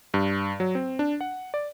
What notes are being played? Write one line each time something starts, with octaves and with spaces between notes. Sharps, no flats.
G2
F#3
C4
D4
F#5
D5